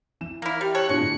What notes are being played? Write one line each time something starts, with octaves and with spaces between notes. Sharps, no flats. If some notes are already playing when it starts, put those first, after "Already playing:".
E3 E7
A#3 E4 F6
G3 G4
A4 C#5 F#6
A#2 G#3 B3 D4 E4 C#7
A2 D3